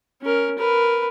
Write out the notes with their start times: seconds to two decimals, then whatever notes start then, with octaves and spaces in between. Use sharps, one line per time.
0.21 C#4 A#4
0.58 A#4 B4